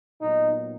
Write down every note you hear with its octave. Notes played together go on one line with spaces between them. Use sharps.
A#2 F#3 B3 D#4